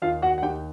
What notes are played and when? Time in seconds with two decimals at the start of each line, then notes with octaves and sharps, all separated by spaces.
0.02 D#2 F4 F5
0.22 F#4 F#5
0.38 F#5
0.42 D#2 G4 G5